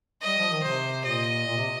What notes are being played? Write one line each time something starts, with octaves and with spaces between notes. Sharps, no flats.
G3 D#5
F3
D#3
C3 C5
A#2 D#5
A#2
C3